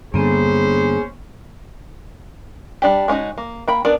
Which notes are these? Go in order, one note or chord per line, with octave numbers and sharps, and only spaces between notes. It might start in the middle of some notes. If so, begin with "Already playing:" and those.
G2 D3 A#3 B3 C#4 G#4 C5
G3 D4 G4
G#3 C#4 D#4 F#4
A#3
A#3 G5 B5
B3 D4 A#4 D5